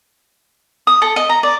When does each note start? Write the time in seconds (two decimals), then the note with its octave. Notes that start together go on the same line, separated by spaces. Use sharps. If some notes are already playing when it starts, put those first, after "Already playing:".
0.87 D#6
1.02 A4
1.16 D#5
1.29 A#5
1.43 D5